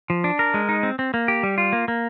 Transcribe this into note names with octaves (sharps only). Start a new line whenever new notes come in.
F3
D4
A#4
G#3
D#4
C4
C4
A#3
G4
G3
F4
A#3
A#3